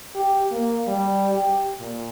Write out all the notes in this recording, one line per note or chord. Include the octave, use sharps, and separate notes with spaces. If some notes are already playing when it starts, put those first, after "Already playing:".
G4
A#3
G3
G4
A#2